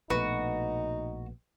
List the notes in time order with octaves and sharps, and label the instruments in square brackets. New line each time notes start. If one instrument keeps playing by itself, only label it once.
[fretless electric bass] A#1 B2 A3 [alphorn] D#4 [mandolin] F#4 [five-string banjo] B4